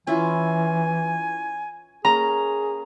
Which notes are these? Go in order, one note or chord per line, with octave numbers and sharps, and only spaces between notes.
E3 C#4 E4 F4 G#5
A#3 C#4 G#4 A#5